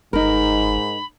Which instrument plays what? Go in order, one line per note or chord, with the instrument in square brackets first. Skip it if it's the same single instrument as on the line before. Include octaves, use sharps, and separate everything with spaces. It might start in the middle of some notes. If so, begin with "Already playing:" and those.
[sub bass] G1 [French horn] G#2 [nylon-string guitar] D#4 A#4 [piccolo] B5